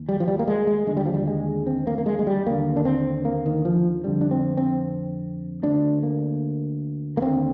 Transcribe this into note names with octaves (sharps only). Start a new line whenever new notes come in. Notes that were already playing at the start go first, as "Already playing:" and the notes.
Already playing: D#2
G3
F3
G3
A#3
G#3
G#3
D#2 D3 G#3
G3
F3
G3
G#3
C4
A#3
A#3
G#3
G#3
G3
D#2 D3 A#3
D4
C4
A#3
D#3
F3
F2 D3 G3
D4
C4
C4
D2 D3 D4
A#3
A#3
D#2 D3 C4